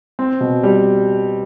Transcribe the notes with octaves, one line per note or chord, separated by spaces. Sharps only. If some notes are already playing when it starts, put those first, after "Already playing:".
C4
B2
G3